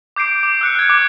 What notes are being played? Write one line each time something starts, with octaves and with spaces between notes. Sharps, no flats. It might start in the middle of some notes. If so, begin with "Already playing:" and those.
D6 G6 C7 D7
G6
D6
E6 F#6 C#7
F6 F#6 G#6
D6